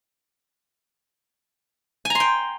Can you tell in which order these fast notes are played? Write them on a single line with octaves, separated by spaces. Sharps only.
G#5 A#5 C6 G5